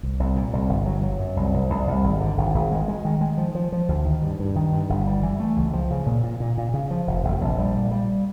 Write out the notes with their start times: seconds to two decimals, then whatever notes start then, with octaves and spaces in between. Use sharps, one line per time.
0.03 C2
0.20 C2
0.36 A#2
0.53 C2
0.69 G1
0.86 F#3
1.03 F#3
1.19 F#2
1.37 C2
1.54 C2
1.70 C2
1.88 C2
2.04 G#1
2.21 D3
2.38 G#1
2.54 G#1
2.71 G#3
2.88 G#3
3.05 D#3
3.21 G#3
3.38 F3
3.55 F3
3.72 F3
3.89 D2
4.05 D#3
4.22 G2
4.39 G2
4.56 D#3
4.72 G2
4.89 G1
5.06 G3
5.23 E3
5.40 A3
5.57 C#2
5.73 F3
5.91 C#3
6.06 A#2
6.23 A#2
6.40 A#2
6.58 A#2
6.74 C#3
6.91 F3
7.07 F1
7.24 F1
7.41 A#1
7.58 G3
7.75 A#2
7.91 G3